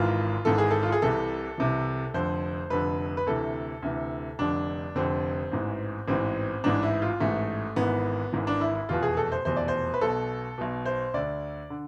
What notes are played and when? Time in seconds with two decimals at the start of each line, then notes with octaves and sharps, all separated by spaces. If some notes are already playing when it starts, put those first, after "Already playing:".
Already playing: G#1 G#2 E3 F4
0.45 G#1 G#2 E3 A4
0.58 G#4
0.71 A4
0.83 F4
0.92 G#4
1.02 C2 C3 E3 A4
1.58 C2 C3 E3
2.14 F1 F2 D3 C5
2.70 F1 F2 D3 B4
3.17 B4
3.26 D2 C3 E3 A4
3.82 D2 C3 E3
4.39 F1 F2 D3 D4
4.95 F1 F2 D3 C4
5.52 A1 G#2 E3
6.08 A1 G#2 E3 C4
6.64 A1 G#2 E3 D4
6.83 E4
7.02 F4
7.20 A1 G#2 E3 A3
7.76 G#1 G#2 E3 B3
8.32 G#1 G#2 E3
8.47 D4
8.61 E4
8.75 E4
8.89 F1 E2 B2 F4
9.03 G#4
9.17 A4
9.32 C5
9.45 F1 E2 B2 C5
9.57 D5
9.68 C5
9.94 B4
10.01 B1 B2 A4
10.58 B1 B2
10.85 C5
11.14 D2 D3 D5
11.70 D3